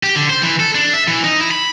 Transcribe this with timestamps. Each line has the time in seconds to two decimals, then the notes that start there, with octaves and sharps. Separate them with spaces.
0.03 G4
0.15 D3
0.30 C5
0.42 E3
0.60 A4
0.75 D4
0.94 E5
1.08 E3
1.24 D#4
1.40 E4
1.51 B5